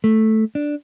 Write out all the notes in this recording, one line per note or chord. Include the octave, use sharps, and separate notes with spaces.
A3
D4